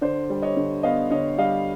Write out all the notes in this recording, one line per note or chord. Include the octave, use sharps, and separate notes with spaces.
D3 C5 D5
G3
C#5 D#5
D3
B3 D#5 F5
D3 C#5 D#5
G3 D#5 F5